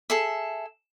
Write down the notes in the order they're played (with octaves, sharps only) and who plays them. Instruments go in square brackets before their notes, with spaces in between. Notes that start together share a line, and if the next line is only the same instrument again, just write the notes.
[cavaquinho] G#4 A4 E5